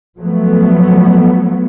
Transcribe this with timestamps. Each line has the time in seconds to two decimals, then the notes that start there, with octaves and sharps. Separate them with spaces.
0.17 F3 F#3 A3 B3